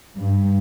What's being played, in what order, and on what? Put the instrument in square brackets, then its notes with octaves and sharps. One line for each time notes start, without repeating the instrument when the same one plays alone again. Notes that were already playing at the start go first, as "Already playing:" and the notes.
[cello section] G2